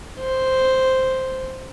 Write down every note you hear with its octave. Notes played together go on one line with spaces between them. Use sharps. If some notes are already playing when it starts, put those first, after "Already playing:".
C5